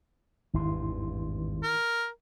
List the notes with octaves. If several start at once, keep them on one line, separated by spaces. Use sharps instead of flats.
G#1 E2 G2 D#3 E4 C6
A#4